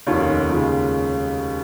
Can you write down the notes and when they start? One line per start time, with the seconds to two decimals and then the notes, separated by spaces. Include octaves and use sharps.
0.07 F1 D#2 D#3 C#4 F4
0.49 D#2 C#3 G#3 F4